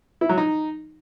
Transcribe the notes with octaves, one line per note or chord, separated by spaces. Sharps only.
E4
F#3
D#4